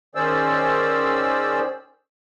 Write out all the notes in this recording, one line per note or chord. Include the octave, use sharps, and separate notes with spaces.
D#3 C#4 G#4 C5 D5 E6